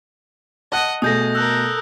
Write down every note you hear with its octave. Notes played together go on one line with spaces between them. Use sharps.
D#5 F#5 A5 F#6
B2 A3 G#4 D#6 G6 A#6
A4 A#4 E6 F#6